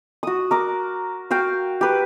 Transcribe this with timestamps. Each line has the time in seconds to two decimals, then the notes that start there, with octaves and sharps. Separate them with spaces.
0.23 F#4 D#6
0.51 A#4 D6
1.31 F#4 F5 G5
1.81 G4 B4